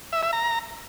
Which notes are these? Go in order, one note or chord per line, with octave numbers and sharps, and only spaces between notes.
E5
E5
A#5